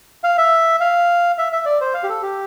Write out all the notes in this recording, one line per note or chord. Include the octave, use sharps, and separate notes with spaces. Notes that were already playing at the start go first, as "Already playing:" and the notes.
F5
E5
F5
E5
E5
D5
C5
F5
G4
A4
G4